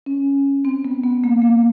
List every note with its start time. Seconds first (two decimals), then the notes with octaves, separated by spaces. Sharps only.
0.06 C#4
0.65 C4
0.85 B3
1.03 B3
1.24 A#3
1.42 A#3